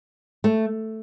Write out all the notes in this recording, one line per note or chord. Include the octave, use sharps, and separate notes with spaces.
A3